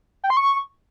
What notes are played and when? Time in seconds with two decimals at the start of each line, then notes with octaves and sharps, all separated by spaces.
0.24 G5
0.30 C6
0.37 C#6